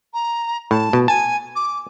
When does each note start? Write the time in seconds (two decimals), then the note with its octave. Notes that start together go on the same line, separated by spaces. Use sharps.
0.14 A#5
0.71 A2 A5
0.93 B2
1.08 G#5 A5
1.56 D6